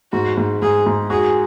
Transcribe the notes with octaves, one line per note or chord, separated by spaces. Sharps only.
G#2 F#4
G#2
G#2 G#4
G#2
F#4 G#4